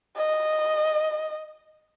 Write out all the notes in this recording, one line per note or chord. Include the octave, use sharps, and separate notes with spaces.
D#5